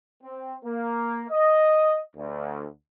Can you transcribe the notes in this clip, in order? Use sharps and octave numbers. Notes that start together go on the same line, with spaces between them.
C4
A#3
D#5
D2